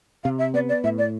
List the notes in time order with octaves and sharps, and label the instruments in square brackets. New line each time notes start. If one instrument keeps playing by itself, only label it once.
[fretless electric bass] C3 [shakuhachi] F5
[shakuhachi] E5
[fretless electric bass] B3 [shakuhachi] D5
[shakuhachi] D5
[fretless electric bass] A2 [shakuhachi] E5
[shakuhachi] D5